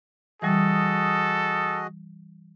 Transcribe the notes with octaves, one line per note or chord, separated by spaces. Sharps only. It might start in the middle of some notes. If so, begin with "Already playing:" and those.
E3 G3 F#4 G#4 A4 D#5